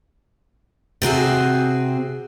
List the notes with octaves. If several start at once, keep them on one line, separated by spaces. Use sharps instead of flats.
C3 C4 F#4 G#4